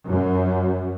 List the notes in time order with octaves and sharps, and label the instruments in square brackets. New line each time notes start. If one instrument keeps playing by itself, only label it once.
[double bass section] F#2